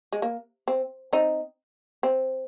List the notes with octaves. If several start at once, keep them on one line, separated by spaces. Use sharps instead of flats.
G#3
A#3
C4
C4 D#4
C4